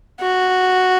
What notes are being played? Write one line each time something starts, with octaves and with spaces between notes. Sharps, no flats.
F#4